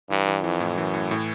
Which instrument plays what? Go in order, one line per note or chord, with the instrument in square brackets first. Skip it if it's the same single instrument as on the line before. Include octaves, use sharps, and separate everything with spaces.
[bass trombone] G2 [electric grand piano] E3
[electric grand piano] E3
[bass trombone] F2 [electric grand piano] E3
[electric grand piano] A2
[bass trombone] F#2 [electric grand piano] E3
[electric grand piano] A2
A2